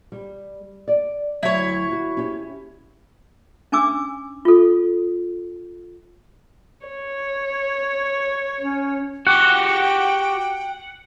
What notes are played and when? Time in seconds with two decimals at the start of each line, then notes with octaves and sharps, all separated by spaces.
0.12 G3
0.88 D5
1.43 D2 F#3 E4 C#5
1.91 F#4
2.17 C#4 G4
3.72 C#4 D4 G#5 D6 E6
4.45 F4 A4
6.87 C#5
8.60 C#4
9.27 F#4 G4 F#5 G5